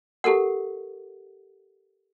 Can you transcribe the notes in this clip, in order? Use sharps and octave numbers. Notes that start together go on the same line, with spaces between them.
G4 A4 A#4 F#5